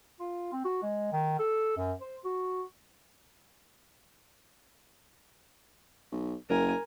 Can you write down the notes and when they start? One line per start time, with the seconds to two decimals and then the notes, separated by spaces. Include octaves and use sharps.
0.20 F4
0.52 C4
0.65 F#4
0.83 G#3
1.12 D#3
1.39 A4
1.77 F#2
2.01 C5
2.24 F#4
6.12 B1
6.49 F#1 A#4 G#5